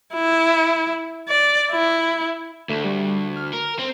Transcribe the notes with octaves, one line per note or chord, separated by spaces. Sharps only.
E4
D5
E4
D2 A3
G3
F6
A#4
C4